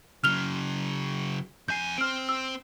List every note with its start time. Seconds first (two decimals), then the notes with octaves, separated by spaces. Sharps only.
0.24 C#3 F#3 F6 F7 G7
1.68 F2 G#5 G6 C7
1.98 C4 C5 F6 D7
2.29 E6